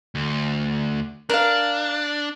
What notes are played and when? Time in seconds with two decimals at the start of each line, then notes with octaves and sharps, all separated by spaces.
0.15 D2
1.29 D4 A#4 F5